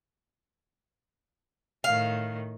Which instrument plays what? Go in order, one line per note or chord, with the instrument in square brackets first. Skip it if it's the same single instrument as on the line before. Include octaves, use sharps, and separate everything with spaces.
[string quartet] A2 D#3 [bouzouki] F5